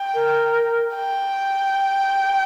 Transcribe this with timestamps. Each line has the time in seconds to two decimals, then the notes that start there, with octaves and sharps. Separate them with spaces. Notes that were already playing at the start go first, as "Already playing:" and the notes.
Already playing: G5
0.14 A#4
0.96 G5